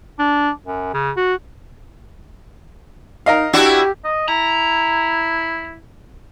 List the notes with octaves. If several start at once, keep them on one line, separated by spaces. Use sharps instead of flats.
D4
F#2
C#3
F#4
D#4 A#4 D#5 F5
D4 E4 F#4 G4
D#5
E4 A#5